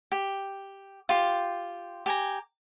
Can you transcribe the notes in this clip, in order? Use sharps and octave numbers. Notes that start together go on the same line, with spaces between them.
G4
F4 G4
G4 G#5 A#5